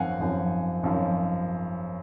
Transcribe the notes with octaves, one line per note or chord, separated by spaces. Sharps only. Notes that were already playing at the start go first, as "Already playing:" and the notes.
Already playing: G#1 F#2 F3 F5 F#5 G#5
G#1 F#2 F3
G#1 F#2 F3